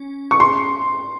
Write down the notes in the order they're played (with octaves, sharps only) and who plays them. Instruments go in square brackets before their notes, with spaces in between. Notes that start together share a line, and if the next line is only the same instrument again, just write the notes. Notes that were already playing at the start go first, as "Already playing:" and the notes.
Already playing: [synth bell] C#4
[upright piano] C#6
C6